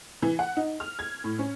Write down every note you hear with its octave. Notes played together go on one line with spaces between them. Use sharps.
E3
F#5
D#4
F6
G#6
A2
C#4